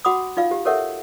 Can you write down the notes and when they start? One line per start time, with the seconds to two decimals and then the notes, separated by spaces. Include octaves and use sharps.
0.05 F#4 F#5 B5 D6 D#6
0.37 D#4 F4 F5
0.51 G4
0.65 G4 A4 A#4 C#5 E5 F#5